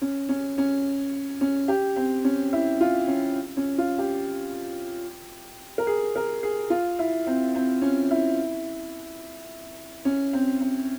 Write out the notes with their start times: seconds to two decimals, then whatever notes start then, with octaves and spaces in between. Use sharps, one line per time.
0.01 C#4
0.29 C#4
0.58 C#4
1.41 C#4
1.68 G4
1.96 C4
2.24 C#4
2.53 E4
2.81 F4
3.08 C#4
3.57 C#4
3.78 F4
3.98 G4
5.78 A#4
5.87 G#4
6.16 A#4
6.43 G#4
6.70 F4
6.99 E4
7.27 C4
7.55 C4
7.82 C#4
8.11 E4
10.05 C#4
10.33 C4
10.61 C4